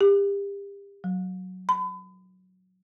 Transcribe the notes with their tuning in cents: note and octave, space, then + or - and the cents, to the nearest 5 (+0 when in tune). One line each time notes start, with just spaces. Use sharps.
G4 +30
F#3 +0
B5 +35